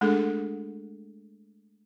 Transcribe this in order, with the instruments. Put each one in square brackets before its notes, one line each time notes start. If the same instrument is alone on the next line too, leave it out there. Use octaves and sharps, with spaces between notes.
[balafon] G#3 A3 D4 G#4 A4